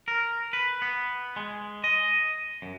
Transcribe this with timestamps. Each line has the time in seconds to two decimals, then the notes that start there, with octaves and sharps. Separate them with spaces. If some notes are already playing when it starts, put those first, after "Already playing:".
0.08 A#4
0.53 B4
0.82 B3
1.36 G#3
1.84 D#5
2.62 F#2